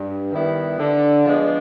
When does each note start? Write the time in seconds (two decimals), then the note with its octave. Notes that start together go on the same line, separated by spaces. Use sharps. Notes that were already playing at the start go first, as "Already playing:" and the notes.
Already playing: G2
0.31 D#3 G3 B3 E4
0.79 D3
1.26 F3 G#3 B3 D4